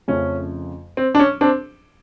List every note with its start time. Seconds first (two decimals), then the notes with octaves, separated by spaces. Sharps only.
0.08 F2 C#3 F3 A3 C#4
0.97 C4
1.15 D4
1.19 C#4
1.41 C4 D4